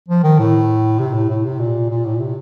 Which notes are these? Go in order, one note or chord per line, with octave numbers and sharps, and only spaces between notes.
F3
D#3
A2
C3
A2
A2
C3
A#2
A#2
A2
A#2
C3